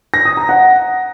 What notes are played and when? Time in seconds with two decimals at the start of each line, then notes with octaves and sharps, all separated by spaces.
0.14 A#6
0.25 D#6
0.37 A#5
0.49 F#5